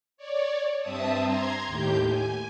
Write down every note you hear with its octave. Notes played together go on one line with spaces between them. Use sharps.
C#5 D5
G2 C4 E5 A5 D#6
A#5 C6 G#6
D#2 A2 G4 G6
G#5